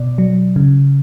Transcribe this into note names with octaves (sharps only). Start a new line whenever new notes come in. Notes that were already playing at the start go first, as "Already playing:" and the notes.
Already playing: B2 D5
F#3
C#3